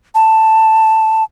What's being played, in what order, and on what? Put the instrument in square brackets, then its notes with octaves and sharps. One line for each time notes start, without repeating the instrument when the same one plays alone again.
[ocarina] A5